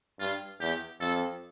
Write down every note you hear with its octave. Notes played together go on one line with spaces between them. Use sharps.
G2 F4
E2 G4
F2 A4